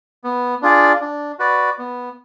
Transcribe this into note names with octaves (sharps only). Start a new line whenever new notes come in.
B3
D4 F4 G#4 D5
D4
F#4 B4 D5
B3